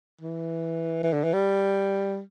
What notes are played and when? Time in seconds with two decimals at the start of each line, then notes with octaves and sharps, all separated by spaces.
0.21 E3
1.03 E3
1.13 D3
1.24 E3
1.33 G3